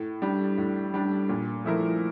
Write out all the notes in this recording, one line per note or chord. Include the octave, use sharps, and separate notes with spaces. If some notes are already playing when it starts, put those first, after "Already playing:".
Already playing: A2
G3 D4
A2
G3 D4
A#2
F3 A3 E4 A#4